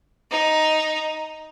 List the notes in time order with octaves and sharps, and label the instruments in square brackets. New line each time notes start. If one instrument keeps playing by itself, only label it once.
[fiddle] D#4